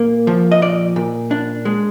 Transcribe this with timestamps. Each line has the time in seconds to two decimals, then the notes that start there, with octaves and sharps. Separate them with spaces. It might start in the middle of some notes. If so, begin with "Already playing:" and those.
Already playing: A#2 A#3
0.27 F3
0.52 D#5
0.61 A#2 D5
0.96 A#2
1.31 D4
1.65 G#3